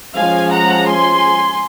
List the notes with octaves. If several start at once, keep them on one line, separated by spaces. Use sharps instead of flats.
F3 G#3 C#4 F5 G#5
F#5 A#5
G#5 C6